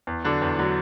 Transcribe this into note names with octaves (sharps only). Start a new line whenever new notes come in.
E2
D3 F#3 D4
E2
D3 F#3